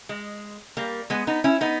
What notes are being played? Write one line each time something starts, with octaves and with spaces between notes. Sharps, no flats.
G#3
G3 A#3
G#3 B3
B3 D#4
C#4 E4
B3 D#4